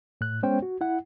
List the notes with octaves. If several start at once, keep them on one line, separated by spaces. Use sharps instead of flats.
A2 F#6
G#3 B3 C#4 C5 C#5 G5
F#4
E4 F#5